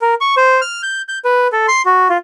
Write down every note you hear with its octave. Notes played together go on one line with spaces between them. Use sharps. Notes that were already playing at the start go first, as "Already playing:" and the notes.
A#4
C#6
C5
F6
G6
G6
B4
A4
C6
F#4
F4